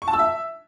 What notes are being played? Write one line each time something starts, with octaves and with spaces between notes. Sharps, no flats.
C#6
A5
E6
E5